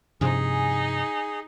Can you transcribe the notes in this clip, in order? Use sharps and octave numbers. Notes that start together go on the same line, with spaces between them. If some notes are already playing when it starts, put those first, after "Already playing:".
G2 C3 F3 D#4 G#4 G#5